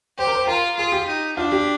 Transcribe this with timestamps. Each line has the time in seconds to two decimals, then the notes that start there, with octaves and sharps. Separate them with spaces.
0.18 G4 C5
0.27 A#4
0.35 C5
0.47 F4 A#4
0.77 F4 G#4
0.92 G4
1.07 D#4
1.37 D4 F4
1.52 G4